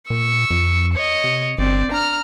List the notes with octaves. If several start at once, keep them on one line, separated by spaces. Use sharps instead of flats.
A#2 C#6 E6
F2
C#5 D#5
C3
G1 C4 D5
D4 A#5 F6